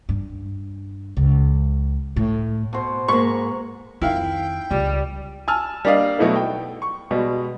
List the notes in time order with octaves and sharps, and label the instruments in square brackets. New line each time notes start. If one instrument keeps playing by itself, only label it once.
[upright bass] G2
C#2
A2
[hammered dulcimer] B2 F#4 C5
[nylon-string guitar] G#2 A#3 [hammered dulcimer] A#5 B5 [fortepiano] C#6
[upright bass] F2 D#3 [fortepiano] E4 F5 [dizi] G5
[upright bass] C#2 [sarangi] G3
[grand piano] G#5 A5 E6 F6
G3 A#3 D4 D5 D#5 F5
B2 F#3 A3 D#4 E4 A4
G5
C#6
B2 G3 G#3